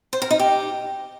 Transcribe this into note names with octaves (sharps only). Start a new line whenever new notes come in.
C5
A#4
D#4
G4